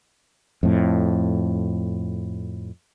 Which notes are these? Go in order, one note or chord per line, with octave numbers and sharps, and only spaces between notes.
F2 A2